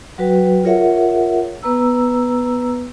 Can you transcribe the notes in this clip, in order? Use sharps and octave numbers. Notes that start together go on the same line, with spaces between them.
F#3 F#4 B4 G5
F4 G#4 A#4 C#5 E5 F#5
B3 B4 A#5 E6